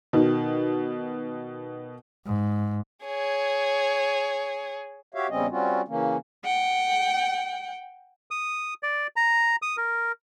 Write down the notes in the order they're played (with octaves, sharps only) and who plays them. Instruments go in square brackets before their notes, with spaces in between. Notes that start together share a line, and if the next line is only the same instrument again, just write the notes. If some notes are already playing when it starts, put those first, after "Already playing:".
[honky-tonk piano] B2 D#3
[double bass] G#2
[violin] G#4 C#5
[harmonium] F#4 G4 C#5 E5 F5
E2 C#3 G3 C4 C#4 D#5
G3 C4 C#4 F4 F#4
C#3 E3 A#3 C#4
[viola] F#5 G5
[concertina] D#6
D5
A#5
D#6
A#4